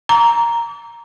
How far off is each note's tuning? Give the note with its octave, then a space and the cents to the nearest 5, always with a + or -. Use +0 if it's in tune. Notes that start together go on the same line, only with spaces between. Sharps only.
A#5 +0 D6 -40